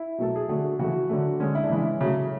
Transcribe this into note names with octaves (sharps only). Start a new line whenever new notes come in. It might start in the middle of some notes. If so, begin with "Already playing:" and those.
Already playing: E4
B2 F#3 A3 A4
G#4
D3 A3 F#4
C#3 E3 A3 F#4
D3 F#3 A3
D3 G#3 C#4
E4
D4
C#3 E3 G#3 E4
C#3 F#3 A3